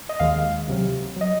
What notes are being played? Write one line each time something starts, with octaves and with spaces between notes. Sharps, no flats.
D#5
D#2 D#3 G#3 F5
C#2 C3 F#3
F#3 D#5